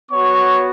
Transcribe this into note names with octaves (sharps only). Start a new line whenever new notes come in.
B3 F#4 C#5 C#6